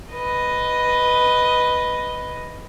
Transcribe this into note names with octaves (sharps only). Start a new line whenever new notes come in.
B4 D#5